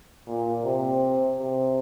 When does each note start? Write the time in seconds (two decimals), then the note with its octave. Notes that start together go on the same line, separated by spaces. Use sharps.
0.27 A#2
0.65 C3
1.40 C3